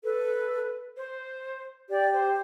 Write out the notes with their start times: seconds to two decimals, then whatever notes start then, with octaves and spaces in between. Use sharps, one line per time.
0.04 A4 B4
0.97 C5
1.89 G4 D5
2.13 C5